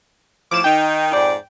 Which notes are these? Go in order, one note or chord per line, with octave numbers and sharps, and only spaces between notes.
A2 F3 D6 E7
D#3 D#4 G5
F2 G#2 D5